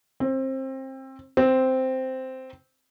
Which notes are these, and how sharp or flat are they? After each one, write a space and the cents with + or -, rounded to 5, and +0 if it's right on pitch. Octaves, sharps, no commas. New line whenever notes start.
C4 +25
C4 -5